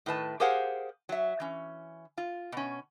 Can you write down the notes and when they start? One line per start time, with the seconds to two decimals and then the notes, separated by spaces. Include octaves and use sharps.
0.06 A2 D#3 B4 A5
0.40 G4 G#4 A#4 C5 F5 F#5
1.09 F#3 E5
1.40 E3 C#4
2.18 F4
2.52 B2 C#4